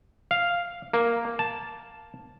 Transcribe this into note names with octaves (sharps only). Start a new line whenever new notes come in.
F5
A#3
A5